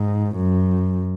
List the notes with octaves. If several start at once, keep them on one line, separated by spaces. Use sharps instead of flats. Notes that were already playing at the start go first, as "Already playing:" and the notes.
Already playing: G#2
F#2